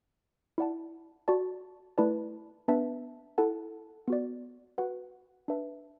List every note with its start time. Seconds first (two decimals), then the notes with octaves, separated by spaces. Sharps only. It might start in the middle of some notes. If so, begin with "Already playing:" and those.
0.58 E4 D5 F#5 A5
1.28 F#4 D5 A5
1.98 A3 E4 B4 D5 A5
2.68 B3 D4 B4 E5 A5
3.38 E4 A4 F#5 A5
4.08 B3 F#4 D5
4.78 F#4 B4 F#5
5.48 D4 B4 E5 A5